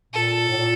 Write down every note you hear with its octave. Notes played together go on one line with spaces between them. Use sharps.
A#2 A4
A2
A#2